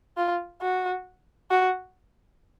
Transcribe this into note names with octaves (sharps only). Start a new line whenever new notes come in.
F4
F#4
F#4